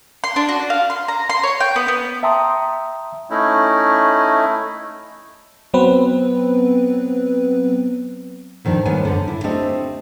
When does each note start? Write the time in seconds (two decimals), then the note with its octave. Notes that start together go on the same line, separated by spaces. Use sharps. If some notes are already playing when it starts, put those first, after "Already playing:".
0.24 C6
0.36 D4
0.49 F#4
0.70 F5
0.90 C6
1.08 A#5
1.30 C6
1.43 C#5
1.60 G5
1.76 B3
1.88 B3
2.23 E5 G5 A5 A#5 C6 D#6
3.30 A3 C#4 D#4 E4
5.74 F#3 B3 C4 B4
8.65 F2 D#3 F3 D4
8.85 D#3 G3 G#3 B3 C#5 G#5
9.05 F#2 D3
9.28 E4
9.44 A3 C4 D4 G4 D5 D#5